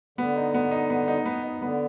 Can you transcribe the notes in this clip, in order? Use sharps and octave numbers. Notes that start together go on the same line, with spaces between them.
D3 B3
D#4
B3
D#4
B3
D#4
B3
D#4
D3 B3